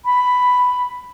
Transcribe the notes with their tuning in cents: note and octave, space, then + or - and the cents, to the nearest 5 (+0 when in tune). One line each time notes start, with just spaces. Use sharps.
B5 +5